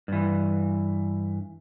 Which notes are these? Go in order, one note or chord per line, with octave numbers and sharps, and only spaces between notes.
G2 E3